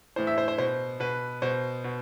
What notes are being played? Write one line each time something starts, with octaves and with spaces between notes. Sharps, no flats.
A2 E3 C5
E5
C5
C5
B2 C5
B2 B4
B2 C5
B2